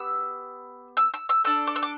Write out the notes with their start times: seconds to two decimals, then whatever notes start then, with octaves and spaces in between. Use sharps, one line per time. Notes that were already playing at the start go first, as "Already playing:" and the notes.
Already playing: B3 G4 E6
0.97 E6
1.14 E6
1.29 E6
1.44 D4 A4 E6
1.67 D6
1.76 E6
1.83 D6